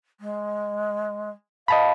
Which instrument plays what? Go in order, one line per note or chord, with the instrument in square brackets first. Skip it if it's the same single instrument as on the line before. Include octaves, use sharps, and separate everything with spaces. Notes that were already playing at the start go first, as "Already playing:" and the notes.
[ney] G#3
[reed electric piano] D#5 A5 B5 [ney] F5